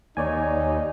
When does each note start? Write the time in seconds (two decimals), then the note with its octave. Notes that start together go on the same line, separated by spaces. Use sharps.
0.17 D#2 D#4 C#5 D5 G#5